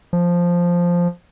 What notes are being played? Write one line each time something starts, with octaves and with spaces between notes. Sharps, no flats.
F3